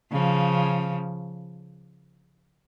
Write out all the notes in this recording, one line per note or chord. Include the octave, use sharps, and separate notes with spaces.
C#3 F3